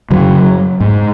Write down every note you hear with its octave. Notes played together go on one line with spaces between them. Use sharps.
F#2 C#3 F#3
G#2